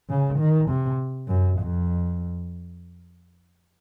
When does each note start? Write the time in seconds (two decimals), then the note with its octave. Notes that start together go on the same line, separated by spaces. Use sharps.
0.09 C#3
0.39 D#3
0.69 C3
1.28 F#2
1.59 F2